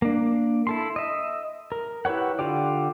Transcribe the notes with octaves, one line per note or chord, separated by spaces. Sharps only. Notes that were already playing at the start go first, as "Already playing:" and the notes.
A#3 D4
E4 A4 C6
D#5 E5
A#4
E4 G4 B4 C#5 F#5
D3 F4 G4 D5